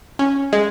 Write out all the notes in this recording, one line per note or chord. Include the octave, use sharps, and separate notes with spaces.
C#4
G#3